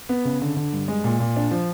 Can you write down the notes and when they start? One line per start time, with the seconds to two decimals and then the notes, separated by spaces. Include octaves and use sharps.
0.09 B3
0.25 C#3
0.41 D3
0.56 D3
0.73 G2
0.88 G#3
1.04 A#2
1.20 A#2
1.36 D4
1.51 F3